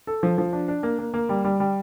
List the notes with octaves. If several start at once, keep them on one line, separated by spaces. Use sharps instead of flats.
A4
F3
F3
D4
D4
A#3
A#3
A#3
G3
G3
G3